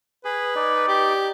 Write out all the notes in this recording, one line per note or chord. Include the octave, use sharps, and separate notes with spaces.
G#4 B4
D#4 D5
G4